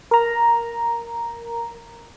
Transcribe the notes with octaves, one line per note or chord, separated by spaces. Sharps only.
A#4 A#5